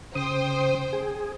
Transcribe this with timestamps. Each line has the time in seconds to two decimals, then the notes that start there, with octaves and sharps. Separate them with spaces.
0.15 C#3 C5 G5 D#6
0.93 G#4